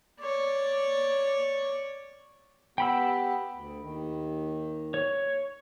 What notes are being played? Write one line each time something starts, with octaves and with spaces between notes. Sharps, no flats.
C#5 D5
B3 G4 G5 B5 E6
D2
D#2 D#3
C#5